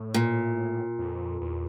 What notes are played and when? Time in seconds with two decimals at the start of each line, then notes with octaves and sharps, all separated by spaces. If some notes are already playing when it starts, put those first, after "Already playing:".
Already playing: A2
0.14 A#2
0.98 F2
1.41 E2